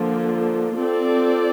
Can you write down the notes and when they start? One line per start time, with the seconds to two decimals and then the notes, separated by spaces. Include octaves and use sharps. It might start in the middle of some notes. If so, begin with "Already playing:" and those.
Already playing: D3 F3 A#3
0.77 C4 F4 A4 D5